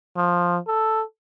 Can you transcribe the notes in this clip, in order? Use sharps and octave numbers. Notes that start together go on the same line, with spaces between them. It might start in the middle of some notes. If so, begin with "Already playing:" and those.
F3
A4